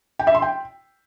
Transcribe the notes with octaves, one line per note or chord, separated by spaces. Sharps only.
G5
E5
C6
G5